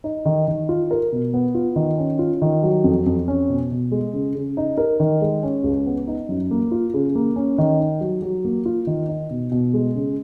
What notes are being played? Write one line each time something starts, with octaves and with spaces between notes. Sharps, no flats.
D#4
D#3
D#3
F4
A#4
B2
B3
F4
D#3
C#4
F4
D#3
F#3
F2
F2
C#4
B2
B2
G#3
C#3
C#3
D#4
A#4
D#3
G#3
C#4
C#2
B3
D#4
F#2
A#3
F4
C#3
A#3
C#4
D#3
D#4
F#3
F#3
A#3
F4
D#3
D#4
B2
B2
G#3
C#3